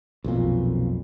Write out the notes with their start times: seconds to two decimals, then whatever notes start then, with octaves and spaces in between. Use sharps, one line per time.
0.24 B1 F2 A#2